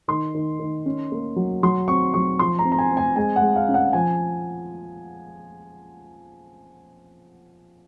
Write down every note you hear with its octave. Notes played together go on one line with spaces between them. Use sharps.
D#3 C6
D#3
D#3
C#4
A#3
F#3
F#3 C6
C4 C#6
F#3 C#6
F3 C6
A#5
C4
A#5
G#5
C4
G#5
G#3 G#5
F#5
G#3
F5
C#4
F#5
F3 G#5